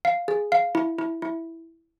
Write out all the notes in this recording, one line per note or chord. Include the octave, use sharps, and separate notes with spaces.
F5
G#4
F5
E4
E4
E4